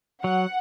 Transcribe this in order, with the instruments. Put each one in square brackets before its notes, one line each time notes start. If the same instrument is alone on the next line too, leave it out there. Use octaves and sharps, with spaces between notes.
[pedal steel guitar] F#3 [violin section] F#5